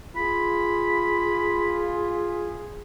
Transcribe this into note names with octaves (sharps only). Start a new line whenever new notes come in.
F4 G#4 B5